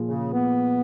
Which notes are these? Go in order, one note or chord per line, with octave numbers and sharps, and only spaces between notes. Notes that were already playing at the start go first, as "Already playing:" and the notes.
Already playing: A#2 F3 A#3 F4 G#4
C#3
B3